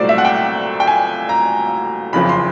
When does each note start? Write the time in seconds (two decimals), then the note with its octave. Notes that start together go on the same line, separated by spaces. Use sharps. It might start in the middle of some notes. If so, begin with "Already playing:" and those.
Already playing: C2 A#2 F#3 A3 C5 D5
0.09 E5
0.18 F#5
0.25 G5
0.80 G5
0.87 G#5
1.29 A#5
2.13 F#1 F2 C#3 F3 B5
2.29 C6